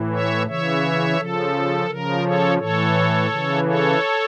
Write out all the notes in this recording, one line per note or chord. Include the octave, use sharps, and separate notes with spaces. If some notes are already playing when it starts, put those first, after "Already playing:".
Already playing: A2 E3
C#5 E5
C#3 E3 C#5 E5
C#3 F3 A4
C#3 F3 A#4
A4 C#5
A2 E3 A4 C#5
C#3 E3
A4 C#5